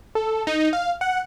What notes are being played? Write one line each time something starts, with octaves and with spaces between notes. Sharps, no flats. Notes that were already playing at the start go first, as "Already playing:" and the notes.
A4
D#4
F5
F#5